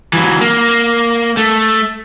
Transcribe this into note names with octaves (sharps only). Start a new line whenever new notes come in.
E3 F#3
A#3
A3